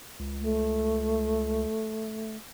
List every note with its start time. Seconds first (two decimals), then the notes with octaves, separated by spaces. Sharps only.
0.19 C#2
0.41 A3